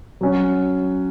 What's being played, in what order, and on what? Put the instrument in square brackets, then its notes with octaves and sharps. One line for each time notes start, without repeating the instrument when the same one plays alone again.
[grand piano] F#3 C#4 F#4